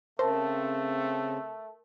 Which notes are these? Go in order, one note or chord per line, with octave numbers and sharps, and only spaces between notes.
C#3 A3 C4 A#4 C5 A5